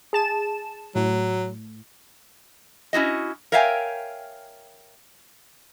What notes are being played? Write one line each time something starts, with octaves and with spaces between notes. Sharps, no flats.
G#4 A5 E7
A2 F#3
C#4 E4 F#4 D#5
A#4 C#5 E5 F5 G5 G#5